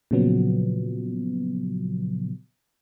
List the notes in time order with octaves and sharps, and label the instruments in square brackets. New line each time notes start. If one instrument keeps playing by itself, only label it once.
[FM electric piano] A#2 C#3 F3 F#3 B3